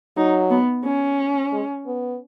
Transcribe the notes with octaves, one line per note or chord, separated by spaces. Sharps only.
F#3 D#4
B3
C#4
G#3
B3